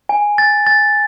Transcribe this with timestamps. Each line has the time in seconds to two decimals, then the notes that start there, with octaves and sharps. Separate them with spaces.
0.09 G#5
0.38 A6
0.66 A6